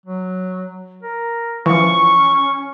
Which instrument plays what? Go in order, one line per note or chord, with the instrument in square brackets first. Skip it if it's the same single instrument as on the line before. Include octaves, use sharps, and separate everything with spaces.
[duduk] F#3
A#4
[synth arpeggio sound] E3 F3 [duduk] C#4 [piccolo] C#6